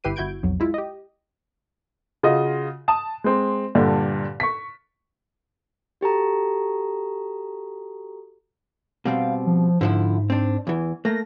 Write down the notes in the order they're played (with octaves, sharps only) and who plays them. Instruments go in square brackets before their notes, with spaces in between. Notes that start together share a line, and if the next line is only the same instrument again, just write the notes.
[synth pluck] G1 E4 G4 B4 C7 D#7
G1 E4 F#4 G6 G#6 D7
B1 F2 F#3
G#3 E4 F4
G4 D#5
[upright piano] C#3 F4 F#4 D#5
A5 D#6 E7
G#3 C4
G2 A#2 D3
C#6 B6
[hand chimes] F#4 G4 A4 A#5
[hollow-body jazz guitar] B2 G3 C4 [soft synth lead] F5
[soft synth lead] F3
[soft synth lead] G#2 [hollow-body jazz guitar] D3 F3 E4
[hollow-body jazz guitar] C4 D4
E2 E3
[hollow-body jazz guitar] A3 A#3 [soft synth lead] A#6